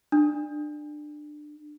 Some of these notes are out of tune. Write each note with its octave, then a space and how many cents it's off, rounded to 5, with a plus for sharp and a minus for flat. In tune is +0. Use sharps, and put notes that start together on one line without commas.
D4 +25